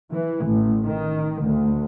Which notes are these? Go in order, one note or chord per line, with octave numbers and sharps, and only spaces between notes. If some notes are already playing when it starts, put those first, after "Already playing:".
E3
A1
D#3
D2